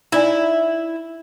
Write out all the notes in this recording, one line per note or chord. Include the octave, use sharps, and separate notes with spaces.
D#4 E4 D5 G#5